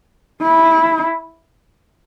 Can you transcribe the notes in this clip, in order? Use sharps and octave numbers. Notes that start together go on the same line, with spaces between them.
E4